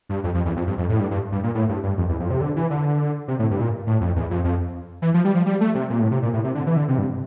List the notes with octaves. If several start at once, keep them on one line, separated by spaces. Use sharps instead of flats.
G2
F2
F2
E2
F2
G2
F2
A2
G2
G2
G2
A#2
A2
G2
G2
F2
E2
F2
C3
D3
E3
D3
C3
A2
G2
A#2
A2
F2
E2
F2
F2
E3
F3
G3
F3
G3
A3
C3
A#2
A2
C3
A#2
A2
C3
D3
E3
D3
C3
G2